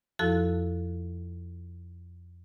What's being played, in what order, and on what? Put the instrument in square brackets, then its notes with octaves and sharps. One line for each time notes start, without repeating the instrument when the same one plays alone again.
[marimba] F2 F3 E4 F#4 A4 F#6